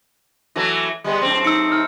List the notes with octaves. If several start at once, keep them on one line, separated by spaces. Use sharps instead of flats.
E3 F#3 A3
G3 G#3 B3
F#2 A2 C4
D#4 E6 C#7
F6